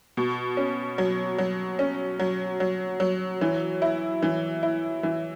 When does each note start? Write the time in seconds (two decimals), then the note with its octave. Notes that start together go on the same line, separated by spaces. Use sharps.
0.17 B2
0.57 C#4
0.98 F#3
1.38 F#3
1.79 C#4
2.19 F#3
2.60 F#3
3.00 F#3
3.41 E3
3.82 E4
4.23 E3
4.63 E4
5.03 E3